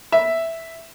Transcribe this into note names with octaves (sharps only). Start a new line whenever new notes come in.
E5